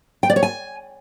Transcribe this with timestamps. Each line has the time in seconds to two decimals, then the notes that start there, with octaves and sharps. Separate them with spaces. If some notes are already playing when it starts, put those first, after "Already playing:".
0.23 G5
0.30 D5
0.36 C#5
0.43 G#5